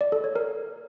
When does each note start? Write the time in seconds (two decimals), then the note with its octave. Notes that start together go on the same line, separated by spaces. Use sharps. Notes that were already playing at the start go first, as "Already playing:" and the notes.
0.01 D5
0.12 A4
0.24 C#5
0.36 A#4